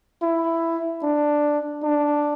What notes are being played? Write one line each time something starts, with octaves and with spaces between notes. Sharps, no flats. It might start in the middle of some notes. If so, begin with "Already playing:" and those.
E4
D4
D4